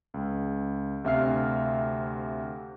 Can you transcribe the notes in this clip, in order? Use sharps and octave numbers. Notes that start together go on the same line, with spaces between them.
C#2
D2 C3 E5 F5 F6 C7